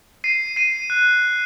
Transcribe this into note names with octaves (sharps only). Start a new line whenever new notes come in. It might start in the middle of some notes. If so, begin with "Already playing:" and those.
C7 D#7
C7 D#7
F#6